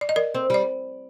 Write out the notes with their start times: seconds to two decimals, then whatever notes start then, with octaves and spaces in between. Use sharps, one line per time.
0.01 D5
0.09 D#5
0.16 A#4 D5
0.34 C4
0.50 G3 D5